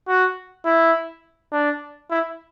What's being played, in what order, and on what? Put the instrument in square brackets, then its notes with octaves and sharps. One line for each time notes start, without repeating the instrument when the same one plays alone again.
[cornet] F#4
E4
D4
E4